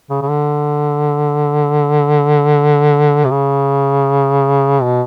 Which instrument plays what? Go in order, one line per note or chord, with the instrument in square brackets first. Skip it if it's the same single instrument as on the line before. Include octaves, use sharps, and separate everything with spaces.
[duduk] C#3
C#3
D3
C3
C#3
B2